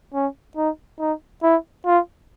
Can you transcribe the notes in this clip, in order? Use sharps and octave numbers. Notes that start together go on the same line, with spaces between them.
C#4
D#4
D#4
E4
F4